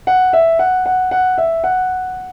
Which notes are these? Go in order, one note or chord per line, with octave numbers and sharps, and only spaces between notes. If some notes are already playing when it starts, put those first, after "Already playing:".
F#5
E5
F#5
F#5
F#5
E5
F#5